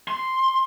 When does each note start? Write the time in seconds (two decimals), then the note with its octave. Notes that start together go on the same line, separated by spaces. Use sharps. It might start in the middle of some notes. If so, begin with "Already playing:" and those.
0.08 C6